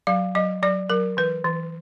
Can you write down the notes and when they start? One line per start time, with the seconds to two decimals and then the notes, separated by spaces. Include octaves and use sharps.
0.07 F#3 F5
0.35 F#3 D#5
0.62 F#3 D5
0.90 F#3 A#4
1.17 E3 B4
1.45 E3